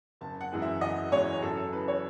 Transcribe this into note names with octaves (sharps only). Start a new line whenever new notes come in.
F#1 A5
F#5
F#2 E3 G#3
E5
F#1 D#5
F#2 E3 G#3 C#5
F#2 A4
A4
C#3 E3 B4
C#5